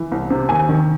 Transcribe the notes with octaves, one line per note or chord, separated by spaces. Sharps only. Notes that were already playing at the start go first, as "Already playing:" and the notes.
Already playing: E3
C2
C3
D#2 G#5
D#3